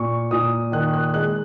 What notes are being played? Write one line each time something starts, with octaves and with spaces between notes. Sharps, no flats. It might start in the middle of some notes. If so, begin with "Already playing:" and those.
Already playing: A#2 C#6
A#2 D#6
D#3 F#6
F#6
G#3 F#6